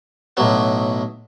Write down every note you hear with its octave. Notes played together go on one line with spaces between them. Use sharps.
B1 A2 F#3 B3